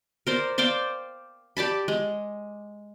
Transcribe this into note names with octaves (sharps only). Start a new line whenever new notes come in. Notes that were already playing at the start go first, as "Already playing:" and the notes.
A#4 C5 D5
C5 D5 F5 G5
G4 D5 A5 B5
G#3